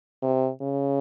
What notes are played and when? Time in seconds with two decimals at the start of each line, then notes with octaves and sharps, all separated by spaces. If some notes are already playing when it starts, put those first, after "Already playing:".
0.22 C3
0.62 C#3